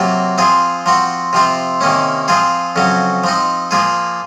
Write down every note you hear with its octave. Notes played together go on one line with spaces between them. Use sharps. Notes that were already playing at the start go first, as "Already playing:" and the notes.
Already playing: C3 F#3 A#3 F4
F3 C4 F4 G#4
F3 C4 F#4
C3 F3 C4 F4
C3 D#3 A#3 C#4
F3 C4 F4 G#4
F2 C#3 F#3 C#4
F3 C4 D#4
F3 A#3 F4 G#4